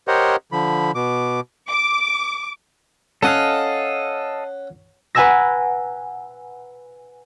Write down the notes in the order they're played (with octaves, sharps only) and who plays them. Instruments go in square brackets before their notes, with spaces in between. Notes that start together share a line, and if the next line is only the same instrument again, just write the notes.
[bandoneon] G4 A#4 C5 C#5 D#5 F#5
D3 F3 B5
B2 D6
[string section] D6
[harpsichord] C#4 F#5 [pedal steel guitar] A4 D#5 F5
[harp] B4 F#5 G#5 A#5 E6 A#6